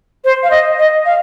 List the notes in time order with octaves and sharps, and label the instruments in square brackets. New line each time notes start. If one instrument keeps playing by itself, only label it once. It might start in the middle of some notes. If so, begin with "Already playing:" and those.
[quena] C5
F5
D#5
D#5
F5